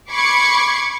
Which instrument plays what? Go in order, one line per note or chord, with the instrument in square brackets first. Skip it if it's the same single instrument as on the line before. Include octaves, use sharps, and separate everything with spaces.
[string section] B5 C#6 D6 G#6 C7 C#7